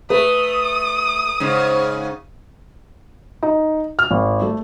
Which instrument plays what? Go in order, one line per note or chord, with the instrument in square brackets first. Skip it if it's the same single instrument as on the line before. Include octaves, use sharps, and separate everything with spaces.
[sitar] A3 [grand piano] B4 [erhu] D#6
[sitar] G#2 C#3
[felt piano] D#4
F6
G#1
A3